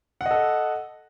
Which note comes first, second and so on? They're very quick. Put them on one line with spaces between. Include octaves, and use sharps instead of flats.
F#5 D#5 A4